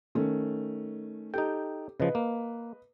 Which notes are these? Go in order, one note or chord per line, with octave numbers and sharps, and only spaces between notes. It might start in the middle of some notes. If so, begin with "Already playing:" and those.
D#3 A3 C#4
D#4 G4 A4 G5
C#3 F3 B4 D#5
A#3